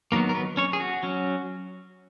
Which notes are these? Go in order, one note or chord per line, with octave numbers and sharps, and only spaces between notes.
D#3 F#3 A#3 B3 A#4
A#4
B3 B4
C#4 C#5
G#4
F#4
F#3 C#4